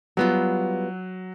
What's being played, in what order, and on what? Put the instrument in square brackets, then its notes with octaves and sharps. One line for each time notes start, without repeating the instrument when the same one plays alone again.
[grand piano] F#3 [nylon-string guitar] G3 B3 F4